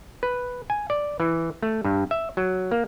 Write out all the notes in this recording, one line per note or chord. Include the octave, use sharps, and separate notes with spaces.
B4
G#5
D5
E3
A3
G2
E5
F#3
A#3